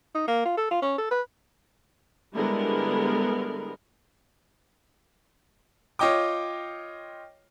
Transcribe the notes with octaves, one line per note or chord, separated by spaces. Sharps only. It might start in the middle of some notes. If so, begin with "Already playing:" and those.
D#4
A#3
F4
A4
F4
C#4
A4
B4
D3 G3 G#3 B3 E4 A#4
F4 C#5 D#5 G5 D6